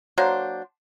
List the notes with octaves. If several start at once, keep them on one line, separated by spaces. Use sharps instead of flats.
F#3 A#3 D4 C5